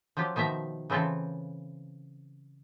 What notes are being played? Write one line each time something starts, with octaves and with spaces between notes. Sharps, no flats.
F3 F#3 F4 G4
B2 D#3 F3 E5 A#5
C#3 E3 C4 F4 A4